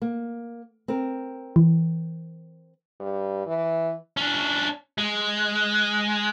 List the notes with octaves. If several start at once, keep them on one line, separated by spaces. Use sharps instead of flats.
A#3
C4 A#4
E3
G2
E3
C#4 D4
G#3